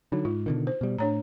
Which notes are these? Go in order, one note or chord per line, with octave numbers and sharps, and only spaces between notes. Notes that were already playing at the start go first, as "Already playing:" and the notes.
D3 F#3 D#4
G#2 F4
B2 D3 D#3
C5
B2 G3
A2 D4 C#5 A#5